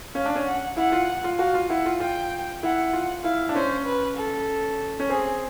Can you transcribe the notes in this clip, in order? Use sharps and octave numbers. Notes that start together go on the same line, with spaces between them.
C#4 F5
D4
C#4
F#5
E4 F#5
F4
F4
F#4 F5
F4
E4 F#5
F4
F4 G5
E4 F#5
F4
E4 F5
D4
C#4 C5
B4
A4
C#4
C4 G#4